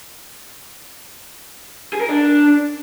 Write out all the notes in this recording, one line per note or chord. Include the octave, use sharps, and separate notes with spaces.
G#4
A#4
D4